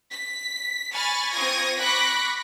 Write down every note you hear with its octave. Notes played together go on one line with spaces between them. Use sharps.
B6
G#5 B5 C#6 F6 A6
C4 F4 C#6 D#6 G#6 A#6
B5 C#6 D6 F#6 A#6 B6